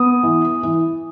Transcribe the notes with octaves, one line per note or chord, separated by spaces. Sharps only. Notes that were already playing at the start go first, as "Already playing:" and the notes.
Already playing: B3 D#6
E3
E3